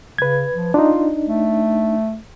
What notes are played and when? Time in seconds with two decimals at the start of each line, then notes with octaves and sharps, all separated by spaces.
0.18 C#3 B4 G#6
0.53 F3
0.74 D4 D#4 F4
1.26 A3